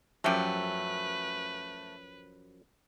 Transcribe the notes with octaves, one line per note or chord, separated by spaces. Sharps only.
F#2 F3 F#3 A3 G4 B4